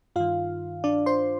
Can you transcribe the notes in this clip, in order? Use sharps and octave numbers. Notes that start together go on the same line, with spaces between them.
G2 D#3 F4 F5
D4 D5
C5 C6